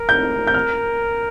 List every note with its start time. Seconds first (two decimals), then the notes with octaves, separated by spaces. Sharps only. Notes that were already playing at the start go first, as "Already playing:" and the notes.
Already playing: A#4
0.09 G6
0.47 G6
0.54 F6